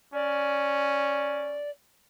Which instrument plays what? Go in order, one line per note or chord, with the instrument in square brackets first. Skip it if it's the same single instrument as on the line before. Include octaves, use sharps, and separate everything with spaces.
[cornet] C#4 [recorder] D5